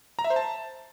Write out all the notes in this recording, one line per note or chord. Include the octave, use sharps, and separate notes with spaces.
A#5
E5
C5
A5